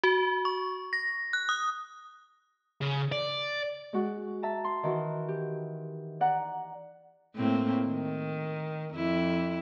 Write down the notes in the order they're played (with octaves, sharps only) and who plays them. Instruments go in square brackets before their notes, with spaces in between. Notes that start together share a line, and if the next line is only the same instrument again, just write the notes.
[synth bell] F#4
C#6
A#6
F#6
D#6
[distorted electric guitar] C#3
D5
[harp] G#3 F#4
E5 A5 A#5
C6
D#3 E3 F#4
G4
D5 F#5 A#5
[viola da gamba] A2 A#3 C4
D#3
F2 E4